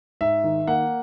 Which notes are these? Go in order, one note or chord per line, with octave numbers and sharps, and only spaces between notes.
G#2 E5
D#3
A#3 F#5